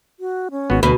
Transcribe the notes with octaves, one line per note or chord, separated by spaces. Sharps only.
F#4
C#4
G#1 B3 F#4
D2 B2 B4